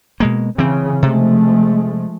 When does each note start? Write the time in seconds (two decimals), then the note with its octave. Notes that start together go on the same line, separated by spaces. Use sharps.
0.20 B2 G#3 A#3
0.58 C#3 E3 C4
1.03 C3 F3 G#3 A3